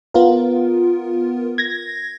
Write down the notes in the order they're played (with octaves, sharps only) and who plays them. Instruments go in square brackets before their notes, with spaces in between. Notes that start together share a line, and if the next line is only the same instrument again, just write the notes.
[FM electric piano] B3 F4 A#4
G#6 A#6